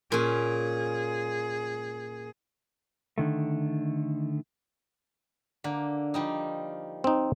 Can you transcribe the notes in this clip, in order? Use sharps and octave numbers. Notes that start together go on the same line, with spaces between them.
A#2 C#4 G#4
D3 D#3 A3
D3 A#3
F3 G3 D#4
C4 D#4